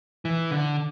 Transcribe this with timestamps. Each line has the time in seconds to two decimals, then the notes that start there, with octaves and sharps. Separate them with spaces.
0.25 E3
0.51 D3